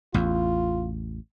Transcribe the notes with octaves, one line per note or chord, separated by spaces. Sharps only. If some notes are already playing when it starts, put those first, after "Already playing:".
A1 E2 F4